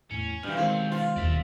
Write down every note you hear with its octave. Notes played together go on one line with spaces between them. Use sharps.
E2 A2 C#4
G2 B2 E3 F#3 F6
D#3 G#3 C4
F4
E1 D#2 D5 E5